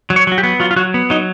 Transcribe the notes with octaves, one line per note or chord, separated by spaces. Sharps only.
F#3
C#5
F#3 F#4
G4
B3
F#3 F4
F4
F#3 F#4
B3
F#3 D#4